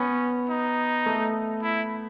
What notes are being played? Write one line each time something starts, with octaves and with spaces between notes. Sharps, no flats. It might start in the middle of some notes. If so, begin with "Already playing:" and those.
Already playing: B3 C#4
D#4
A3
E4